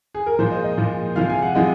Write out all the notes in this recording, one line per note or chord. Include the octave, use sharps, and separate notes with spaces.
G#4
A#4
A#2 F3 G#3 C5
D#5
D#5
A#2 F3 G#3
C3 F3 G#3 F5
G#5
F#5
C3 F3 G#3 D#5